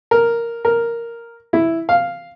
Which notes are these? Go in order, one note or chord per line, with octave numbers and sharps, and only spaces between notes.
A#4
A#4
E4
F5